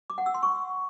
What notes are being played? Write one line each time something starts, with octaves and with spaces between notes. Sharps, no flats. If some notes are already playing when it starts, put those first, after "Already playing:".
D6
F#5
E6
C6
C#6